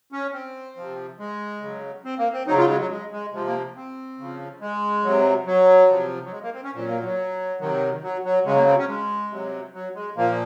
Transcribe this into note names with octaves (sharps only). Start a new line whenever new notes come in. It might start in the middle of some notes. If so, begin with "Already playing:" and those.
C#4
C4
C3 F3
G#3
C#3 F#3
C4
A#3
C4
C#3 F#3 D#4
F4
G#3
F#3
G#3
G#3
C3 F3 G#3
A#3
C4
C#3 F3
G#3
C3 F#3
F#3
C3 F3
F#3
G#3
A#3
C4
C#4
A#2 F#3 C4
A#3
F#3
C3 D#3 F#3
F#3
F#3
C#3 F#3 G#3
A#3
C4
C#4
G#3
C3 F#3
F#3
G#3
A#2 F3 A#3